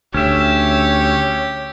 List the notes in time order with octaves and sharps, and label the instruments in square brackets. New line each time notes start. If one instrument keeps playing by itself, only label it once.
[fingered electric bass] D2 [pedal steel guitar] C#4 E5 [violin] G4 [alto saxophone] C#5